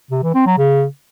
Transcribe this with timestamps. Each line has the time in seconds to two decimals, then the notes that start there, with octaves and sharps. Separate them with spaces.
0.11 C3
0.23 E3
0.35 C4
0.46 F#3
0.58 C#3